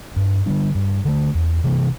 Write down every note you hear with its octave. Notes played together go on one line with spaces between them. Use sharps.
G2
D3 G3 D4
G2
D3 A3
E2
C3 E3 A#3